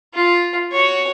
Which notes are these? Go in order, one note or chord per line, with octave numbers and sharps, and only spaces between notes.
F4
F#4 C#5